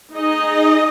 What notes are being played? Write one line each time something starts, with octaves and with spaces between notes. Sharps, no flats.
D#4 G#4 D#5